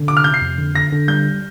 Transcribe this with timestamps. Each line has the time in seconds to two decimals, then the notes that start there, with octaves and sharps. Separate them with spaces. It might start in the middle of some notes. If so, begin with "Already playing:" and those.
Already playing: D3
0.08 C3 D6
0.17 F6
0.24 C3 G6
0.34 C7
0.41 F2
0.58 D3
0.75 D3 A#6
0.92 D3
1.08 G3 G6